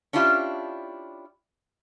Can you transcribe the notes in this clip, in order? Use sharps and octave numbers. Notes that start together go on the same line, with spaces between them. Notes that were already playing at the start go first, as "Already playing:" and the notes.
C#4 D4 E4 F4 G4